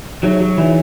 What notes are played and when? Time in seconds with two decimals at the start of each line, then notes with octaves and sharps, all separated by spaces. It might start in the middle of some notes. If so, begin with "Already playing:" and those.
0.23 F#3 D#4 G#4 C#5 E5
0.40 F#3
0.58 E3 D#4 G#4 C#5 E5